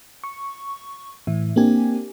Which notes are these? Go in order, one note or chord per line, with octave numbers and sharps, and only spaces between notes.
C#6
A2 E3 E5
A#3 C4 D4 G4 G#5